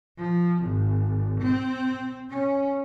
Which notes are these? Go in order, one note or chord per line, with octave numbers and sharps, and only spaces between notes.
F3
G#1
C4
C#4